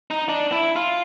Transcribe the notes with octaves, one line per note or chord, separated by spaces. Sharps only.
D#4
D4
E4
F4